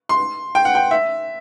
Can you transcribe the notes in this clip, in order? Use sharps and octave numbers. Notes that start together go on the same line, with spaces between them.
C6
G5
F#5
G5
E5